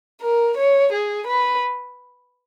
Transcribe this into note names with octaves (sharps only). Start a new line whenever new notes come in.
A#4
C#5
G#4
B4